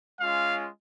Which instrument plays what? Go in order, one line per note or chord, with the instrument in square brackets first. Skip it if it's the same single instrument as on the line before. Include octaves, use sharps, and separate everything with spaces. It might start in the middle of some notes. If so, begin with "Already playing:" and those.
[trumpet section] G#3 C#4 F4 F5